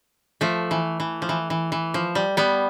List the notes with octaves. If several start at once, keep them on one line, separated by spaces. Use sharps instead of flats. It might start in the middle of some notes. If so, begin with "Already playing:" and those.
F3 A3
E3
E3
F3
E3
E3
E3
F3
G3
G3 B3